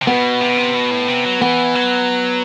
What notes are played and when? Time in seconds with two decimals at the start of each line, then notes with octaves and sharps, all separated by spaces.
0.02 C3
0.07 B2 B3
0.41 C3
0.50 B2
0.58 C3
0.74 B2
0.91 A2
1.08 C3
1.25 F#3
1.42 E3 B3
1.75 F#3